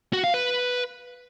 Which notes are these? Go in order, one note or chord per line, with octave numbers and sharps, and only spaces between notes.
F#4
F5
B4